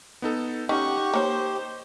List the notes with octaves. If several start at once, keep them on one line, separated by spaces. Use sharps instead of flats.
B3 D#4 A4
C#4 D#4 G4 F#5 C#6
A#3 C5 C#5